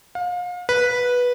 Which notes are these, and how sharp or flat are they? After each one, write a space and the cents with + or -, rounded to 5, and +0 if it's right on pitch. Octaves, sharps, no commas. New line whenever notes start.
F5 +35
B4 -10